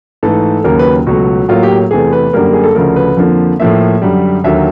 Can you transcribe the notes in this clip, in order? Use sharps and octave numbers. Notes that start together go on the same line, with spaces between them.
G#2 E3 A3 A4
D#2 C#3 F#3 A#3 A#4
B4
C#2 B2 F#3 A3 F#4
A2 F#3 A#3 F4
G4
E2 C3 E3 A3 G#4
B4
F#2 D3 G3 A#3 A#4
G#4
A4
D2 C#3 F3 A3 A#4
B4
F2 D3 F3 A#3
A2 F3 A#3 E5
F#2 D3 G3
D#2 D3 F#3 A#3 E5